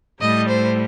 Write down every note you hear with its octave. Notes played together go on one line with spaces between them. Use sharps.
A2 G3 D#5
C5